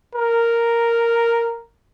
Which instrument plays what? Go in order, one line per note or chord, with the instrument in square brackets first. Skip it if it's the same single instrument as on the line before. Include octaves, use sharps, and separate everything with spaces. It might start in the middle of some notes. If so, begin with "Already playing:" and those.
[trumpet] A#4